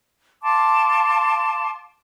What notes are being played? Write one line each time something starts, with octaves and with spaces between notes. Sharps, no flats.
F5 A5 C6 D6